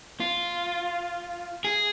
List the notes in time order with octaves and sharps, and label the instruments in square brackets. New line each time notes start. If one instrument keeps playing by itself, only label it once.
[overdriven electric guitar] F4
G#4